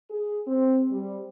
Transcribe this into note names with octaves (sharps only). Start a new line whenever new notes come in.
G#4
C4
G3